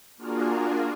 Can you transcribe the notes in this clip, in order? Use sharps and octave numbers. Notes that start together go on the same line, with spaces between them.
A#3 D4 F4 F#4 G#4 A#4